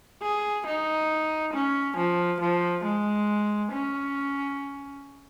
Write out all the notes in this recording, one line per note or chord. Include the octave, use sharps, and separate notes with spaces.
G#4
D#4
C#4
F3
F3
G#3
C#4